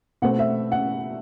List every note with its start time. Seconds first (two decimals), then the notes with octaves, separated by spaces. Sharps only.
0.22 B2 A3 C4 F#5
0.39 E5
0.72 F#5